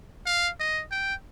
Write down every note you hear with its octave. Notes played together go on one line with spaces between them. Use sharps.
F5
D#5
G5